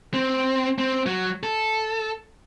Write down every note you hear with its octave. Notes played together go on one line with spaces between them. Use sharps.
C4
C4
F#3
A4